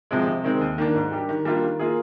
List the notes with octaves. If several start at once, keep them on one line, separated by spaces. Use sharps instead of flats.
C3 F3 G#3
C3
D#3 G#3 C4
D#2
D#3 A#3 D4
G#2
G3 D4 G4 A#4
D#3
G3 A#3 D4 F4
D#3
A#3 F4 G#4